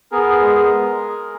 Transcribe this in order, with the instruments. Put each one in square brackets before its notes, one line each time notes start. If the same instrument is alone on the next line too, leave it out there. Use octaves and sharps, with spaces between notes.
[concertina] B3 G#4 A#4
G#3
G#3